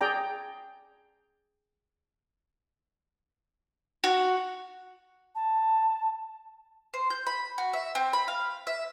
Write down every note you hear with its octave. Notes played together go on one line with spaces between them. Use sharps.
G#4 D5 G5 A#5
F#4
A5
C5
G6
B5
F#4
E5
C4
B5
F5
E5